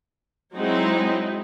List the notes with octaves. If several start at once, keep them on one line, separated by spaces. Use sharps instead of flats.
F#3 G#3 C4 D#4 E4